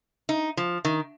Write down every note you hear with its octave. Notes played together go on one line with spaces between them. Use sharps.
D#4
F3
D#3